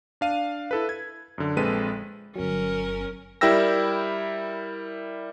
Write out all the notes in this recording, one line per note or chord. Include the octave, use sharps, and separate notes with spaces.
D4 F5 D#7
E4 A4 B4
G#6
F#2 D3
A#1 G#3 C4 A4 B4 D#7
G1 F#3 C#4 A#4
G3 E4 A#4 G5 E6 A#6